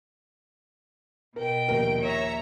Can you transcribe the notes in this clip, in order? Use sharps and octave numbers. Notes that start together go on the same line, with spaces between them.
B2 A#4 G5
A#1 D#2 A#4
C#5 E5 A#5